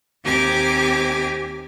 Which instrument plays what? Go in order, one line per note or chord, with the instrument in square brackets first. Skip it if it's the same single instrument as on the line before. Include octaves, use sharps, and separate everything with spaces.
[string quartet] D#2 C4 G4 G#5 A#5 D6